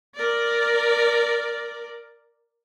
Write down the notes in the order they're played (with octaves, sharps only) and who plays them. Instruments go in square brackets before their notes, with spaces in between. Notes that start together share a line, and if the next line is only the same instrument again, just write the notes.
[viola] A#4 D5